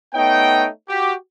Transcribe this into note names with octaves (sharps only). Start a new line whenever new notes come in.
A3 B3 D#4 C#5 G5
F#4 G4